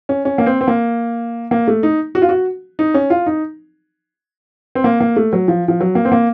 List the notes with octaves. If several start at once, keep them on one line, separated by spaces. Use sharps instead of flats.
C#4
C#4
A#3
C4
C4
A#3
A#3
A3
D#4
F#4
F4
F#4
D#4
C#4
F4
D#4
C4
A#3
A#3
A3
F#3
F3
F3
F#3
A#3
C4
A#3